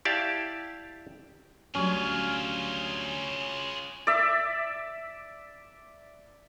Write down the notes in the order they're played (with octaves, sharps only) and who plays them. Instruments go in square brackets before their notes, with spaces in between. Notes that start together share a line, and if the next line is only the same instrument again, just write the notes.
[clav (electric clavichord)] E4 G4 D5 E5 F5 A5
[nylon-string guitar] D2 F#3 G3 [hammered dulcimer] C#4 [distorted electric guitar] F4 G#4
[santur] D5 E5